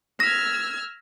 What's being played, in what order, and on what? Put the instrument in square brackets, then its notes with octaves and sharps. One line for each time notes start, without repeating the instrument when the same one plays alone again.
[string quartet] E6 F6 G#6 [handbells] A#6 B6